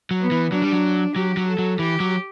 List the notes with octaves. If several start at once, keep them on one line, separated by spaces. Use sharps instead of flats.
F#3
B3
E3
F#3 D4
G3
F#3
F#3 G4
F#3
A4
F#3
E3 G4
F#3